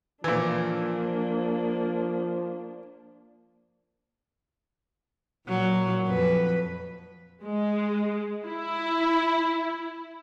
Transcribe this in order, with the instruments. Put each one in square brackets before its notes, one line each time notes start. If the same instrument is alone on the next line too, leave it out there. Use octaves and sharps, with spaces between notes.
[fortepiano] A#2 E3 [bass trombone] F3 [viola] A#3 D4
[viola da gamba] A#2 F#3
F2 B4
[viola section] G#3
E4